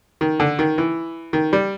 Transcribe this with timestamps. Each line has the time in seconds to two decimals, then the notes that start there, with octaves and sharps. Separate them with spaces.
0.21 D#3
0.40 D3
0.59 D#3
0.78 E3
1.33 D#3
1.53 G3